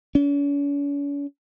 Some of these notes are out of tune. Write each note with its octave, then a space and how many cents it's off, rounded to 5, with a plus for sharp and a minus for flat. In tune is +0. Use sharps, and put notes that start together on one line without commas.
C#4 +45